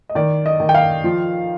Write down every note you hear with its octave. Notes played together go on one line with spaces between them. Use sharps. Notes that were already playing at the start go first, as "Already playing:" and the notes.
D#5
D#3 D5
D#5
D#3
G5
F5
F3